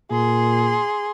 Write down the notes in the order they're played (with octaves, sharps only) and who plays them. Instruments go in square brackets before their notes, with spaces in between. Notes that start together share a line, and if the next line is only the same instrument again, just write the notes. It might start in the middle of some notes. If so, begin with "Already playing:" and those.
[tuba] A#2 [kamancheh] G#4 C6